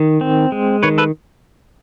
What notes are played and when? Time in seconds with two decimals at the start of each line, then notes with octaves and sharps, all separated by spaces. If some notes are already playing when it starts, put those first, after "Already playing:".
Already playing: D#3
0.21 C4
0.52 G#3
0.83 D#3 B4 C#5
0.98 A4 B4